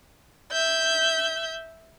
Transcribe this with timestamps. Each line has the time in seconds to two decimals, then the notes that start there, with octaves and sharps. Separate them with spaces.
0.52 E5 G6